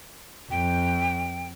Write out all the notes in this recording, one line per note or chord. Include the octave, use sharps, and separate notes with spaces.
F2 G5